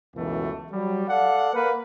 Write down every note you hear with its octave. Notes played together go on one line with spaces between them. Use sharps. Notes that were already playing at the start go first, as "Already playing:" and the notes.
C#2 F#2 B2 E3 A3
F#3 G3
A4 D5 F5 F#5
A#3 A#4 B4